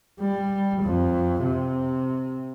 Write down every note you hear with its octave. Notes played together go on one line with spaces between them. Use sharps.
G3
F2
C3